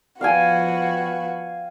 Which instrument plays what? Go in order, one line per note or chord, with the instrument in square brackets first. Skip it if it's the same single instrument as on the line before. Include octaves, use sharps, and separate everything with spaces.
[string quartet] F3 B3 F#4 [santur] F5 G5 G#5